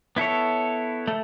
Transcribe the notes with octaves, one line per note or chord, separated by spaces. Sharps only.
B3 E4 A4 C#5
A3